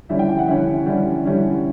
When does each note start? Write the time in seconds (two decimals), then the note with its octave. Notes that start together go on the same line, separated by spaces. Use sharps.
0.09 D3 G3 C#4 E4 E5
0.19 G5
0.29 G5
0.39 F#5
0.48 D3 G3 C#4 E4 E5
0.86 D3 G3 C#4 E4
1.24 D3 G3 C#4 E4